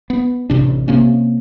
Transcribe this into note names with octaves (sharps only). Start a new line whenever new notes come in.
B3
A1 C3 D4
C3 A#3 C#4